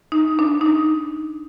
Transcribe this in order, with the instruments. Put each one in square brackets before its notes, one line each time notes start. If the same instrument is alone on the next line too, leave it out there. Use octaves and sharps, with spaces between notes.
[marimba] D#4
D4
D#4
D4